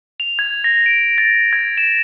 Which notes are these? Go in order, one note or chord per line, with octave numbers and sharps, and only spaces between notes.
F7
G#6
A#6
D7
A6
G#6
E7